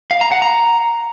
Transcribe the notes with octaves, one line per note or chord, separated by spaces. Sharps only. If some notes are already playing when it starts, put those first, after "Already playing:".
F5
A#5
F#5
A#5